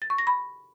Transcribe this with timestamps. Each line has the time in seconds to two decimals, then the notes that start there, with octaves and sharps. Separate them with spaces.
0.02 A6
0.10 C#6
0.18 A#6
0.27 B5